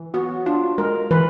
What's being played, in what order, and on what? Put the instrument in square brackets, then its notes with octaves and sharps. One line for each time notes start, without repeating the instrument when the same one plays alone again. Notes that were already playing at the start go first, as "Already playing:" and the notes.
Already playing: [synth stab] E3
[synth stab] B3 [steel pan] F#4
[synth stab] D4 [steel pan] F4
[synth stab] G#3 [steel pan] A#4
[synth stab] E3 [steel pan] B4